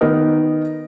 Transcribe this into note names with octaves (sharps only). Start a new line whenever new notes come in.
D#3 B3 D#4 A#4 D#5